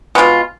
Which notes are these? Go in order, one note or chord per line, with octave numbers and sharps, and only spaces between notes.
B2 G#3 C4 F4